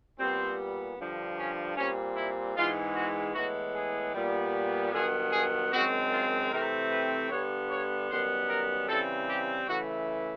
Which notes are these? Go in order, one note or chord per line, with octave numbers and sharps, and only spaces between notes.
A#2 G3 B3 C4
G2 D3 F3
C#4
A#2 G3 C4 C#4
E4
G#2 E3 G#3 B3 F4
F#4
A2 E3 G#3 B3 F#4
G#4
A#2 G3 B3
G2 D#3 F#3 B3 G#4
G#4
F#2 D#3 G#3 C4 F#4
F4
C3 E3 A3 C4 A#4
B4
G2 D3 G3 B3 C#5
C#5
F#2 D#3 G3 B3 C5
A#4
C#3 E3 G3 C4 A4
G4
C#3 E3 A3 F#4